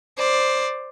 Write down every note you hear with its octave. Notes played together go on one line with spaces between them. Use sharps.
C5 D5